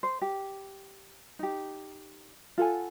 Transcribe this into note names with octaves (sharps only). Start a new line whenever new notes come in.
C5
G4
D#4 G4
F4 A4 F#5 G#5